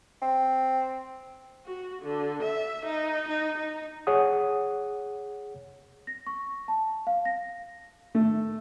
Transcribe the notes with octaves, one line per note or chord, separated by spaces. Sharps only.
C4
F#4
D3
E5
D#4
D#4
D#4
G#4 C#5 F#5 D#6
A#6
C#6
A5
F5
A#6
A3